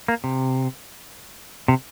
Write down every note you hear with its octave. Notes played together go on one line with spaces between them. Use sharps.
A#3
C3
C3